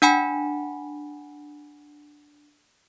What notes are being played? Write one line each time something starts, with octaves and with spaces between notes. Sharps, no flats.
D4 F#5 G#5 B5